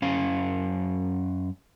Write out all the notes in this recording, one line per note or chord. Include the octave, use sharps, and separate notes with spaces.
F#2 C#4 F5